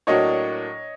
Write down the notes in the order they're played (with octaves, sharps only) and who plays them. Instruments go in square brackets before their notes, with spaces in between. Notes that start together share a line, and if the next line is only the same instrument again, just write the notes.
[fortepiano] A2 F#3 A#3 D4 F#4 [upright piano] C#5 D#5